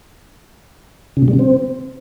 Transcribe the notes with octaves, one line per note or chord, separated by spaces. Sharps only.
C#3
B2
G3
C#3
C4